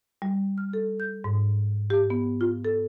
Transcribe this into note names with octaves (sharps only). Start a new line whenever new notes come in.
G3
F6
A4
G6
G#2
G4
B3
F4
A4